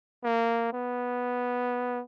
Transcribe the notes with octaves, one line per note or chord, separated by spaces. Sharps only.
A#3
B3